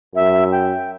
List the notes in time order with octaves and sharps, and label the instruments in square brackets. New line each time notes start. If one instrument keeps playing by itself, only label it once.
[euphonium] F#2 [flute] E5
[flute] G5